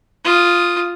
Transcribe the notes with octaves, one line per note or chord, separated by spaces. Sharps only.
F4 D#6